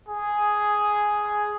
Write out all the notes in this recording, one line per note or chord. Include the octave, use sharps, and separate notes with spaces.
G#4